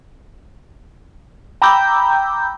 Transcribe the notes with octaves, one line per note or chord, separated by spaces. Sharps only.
G5 A#5 B5 D6 E6 G6